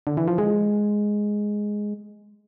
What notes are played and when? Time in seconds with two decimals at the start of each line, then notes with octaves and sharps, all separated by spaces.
0.07 D3
0.17 E3
0.28 F3
0.38 G#3